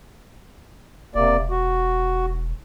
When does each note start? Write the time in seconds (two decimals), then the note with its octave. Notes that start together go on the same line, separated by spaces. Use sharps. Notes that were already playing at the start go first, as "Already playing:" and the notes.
1.15 E1 C3 A#3 D5
1.51 F#4